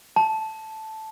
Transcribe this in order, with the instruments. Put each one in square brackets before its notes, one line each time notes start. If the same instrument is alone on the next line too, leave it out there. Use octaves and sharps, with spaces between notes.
[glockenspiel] A5